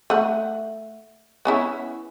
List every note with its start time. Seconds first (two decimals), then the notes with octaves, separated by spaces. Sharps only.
0.10 A3 F#5
1.45 B3 C#4 E4